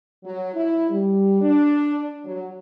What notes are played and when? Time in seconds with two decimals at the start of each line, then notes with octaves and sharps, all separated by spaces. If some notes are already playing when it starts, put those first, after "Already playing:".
0.24 F#3
0.54 E4
0.90 G3
1.41 D4
2.25 F#3